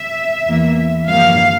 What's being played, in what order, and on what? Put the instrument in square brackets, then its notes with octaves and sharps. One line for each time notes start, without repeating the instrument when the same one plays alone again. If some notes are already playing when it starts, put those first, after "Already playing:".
Already playing: [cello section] E5
E2 E3 A#3
G2 F3 A#3 F5